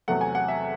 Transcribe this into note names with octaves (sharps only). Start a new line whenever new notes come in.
E2 C3 F#3 A3 F#5
G#5
F#5
E5